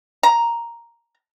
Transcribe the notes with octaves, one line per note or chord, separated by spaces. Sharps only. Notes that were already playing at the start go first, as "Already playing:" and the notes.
A#5